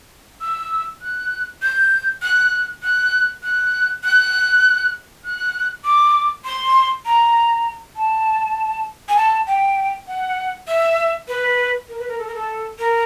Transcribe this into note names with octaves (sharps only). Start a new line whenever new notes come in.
E6
F#6
G6
F#6
F#6
F#6
F#6
F#6
D6
C6
A#5
A5
G#5
A5
G5
F#5
E5
B4
A#4
B4
A#4
A4
A#4
A4
A#4